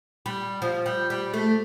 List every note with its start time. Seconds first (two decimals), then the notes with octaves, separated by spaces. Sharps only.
0.26 G3
0.62 F3
0.86 G3
1.10 G3
1.33 A3